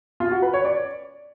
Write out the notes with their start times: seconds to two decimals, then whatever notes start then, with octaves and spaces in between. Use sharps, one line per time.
0.20 F4
0.31 F#4
0.42 B4
0.54 C#5
0.65 D5